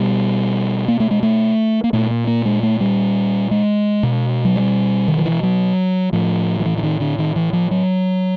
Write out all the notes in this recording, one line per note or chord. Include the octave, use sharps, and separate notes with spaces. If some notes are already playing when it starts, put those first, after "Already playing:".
Already playing: B2 G3
A#3
A3
G#3
A3
A#3
A#2 A3
A#3
A#3
G#3
A3
G3
G#3
B2
F#3
G3
D#3
F3
E3
F#3
A2 F3
F3
E3
E3
D#3
D3
D#3
E3
F3
F#3